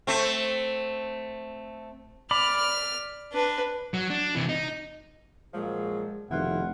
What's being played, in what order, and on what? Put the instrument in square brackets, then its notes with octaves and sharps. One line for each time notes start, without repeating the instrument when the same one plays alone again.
[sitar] A3 C4
[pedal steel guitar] D5 B5 D6 [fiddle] F6
[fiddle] D4 B4
[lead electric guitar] F#3
D4
C3 E3
D#4
[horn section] A#2 F3 F#3 [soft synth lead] G#3 [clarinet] G#4
[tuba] F1 [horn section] B2 E4 F4 [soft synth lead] D#3 [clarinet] F#5